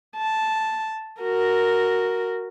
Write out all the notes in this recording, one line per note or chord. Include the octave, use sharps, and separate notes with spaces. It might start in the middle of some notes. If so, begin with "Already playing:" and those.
A5
F#4 A#4